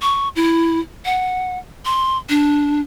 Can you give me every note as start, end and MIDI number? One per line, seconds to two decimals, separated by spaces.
0.02 0.29 85
0.36 0.80 64
1.05 1.59 78
1.86 2.17 84
2.29 2.80 62